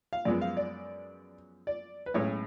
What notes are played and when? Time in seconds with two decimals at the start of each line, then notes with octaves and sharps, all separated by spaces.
0.13 F5
0.25 F#2 F3 G#3 B3 D5
0.41 F5
0.57 D5
1.67 D5
2.06 B4
2.14 B1 A2 G#3 C#4 C#5